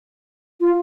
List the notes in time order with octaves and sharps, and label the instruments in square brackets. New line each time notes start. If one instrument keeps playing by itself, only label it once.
[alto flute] F4